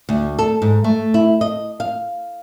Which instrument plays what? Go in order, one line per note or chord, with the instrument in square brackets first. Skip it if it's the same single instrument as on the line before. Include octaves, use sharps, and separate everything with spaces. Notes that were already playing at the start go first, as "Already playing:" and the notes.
[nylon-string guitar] D2
A4
G#2
A3
E4
D#5
F5